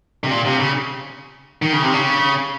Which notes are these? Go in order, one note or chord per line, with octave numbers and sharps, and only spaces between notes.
C3
A#2
C3
C#3
D#3
C#3
C3
C#3